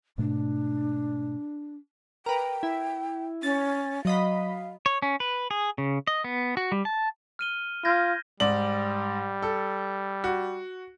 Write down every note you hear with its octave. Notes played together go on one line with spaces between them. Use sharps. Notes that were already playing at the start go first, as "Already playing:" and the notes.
G#2 B2 A3 D4
A#4 B4 G5
E4
C#4 A6
F#3 D#5 F5 B5
C#5
C#4
B4
G#4
C#3
D#5
B3
F#4
G3
A5
F6 D#7 G7
F4 G6 G#6 A#6
G#2 G3 D5 F#7
A4
F#4